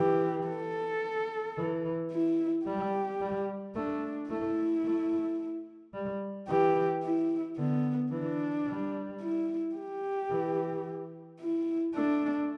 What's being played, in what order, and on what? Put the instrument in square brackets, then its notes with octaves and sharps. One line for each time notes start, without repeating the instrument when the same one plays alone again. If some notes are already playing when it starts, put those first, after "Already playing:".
Already playing: [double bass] E3 [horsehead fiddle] G4
[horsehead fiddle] A4
[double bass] E3
[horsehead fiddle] E4
[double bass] G3 [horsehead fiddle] G4
[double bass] G3
[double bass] A3 [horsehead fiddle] D4
[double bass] A3 [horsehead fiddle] E4
[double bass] A3
G3
[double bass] E3 [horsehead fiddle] G4
[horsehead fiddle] E4
[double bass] D3 [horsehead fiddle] B3
[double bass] E3 [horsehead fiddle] D4
[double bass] G3
[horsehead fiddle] E4
G4
[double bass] E3
[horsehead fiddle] E4
[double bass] A3 [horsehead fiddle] D4